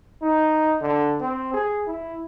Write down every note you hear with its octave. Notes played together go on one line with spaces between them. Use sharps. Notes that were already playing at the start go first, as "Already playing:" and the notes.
D#4
D3
C4
G#4
E4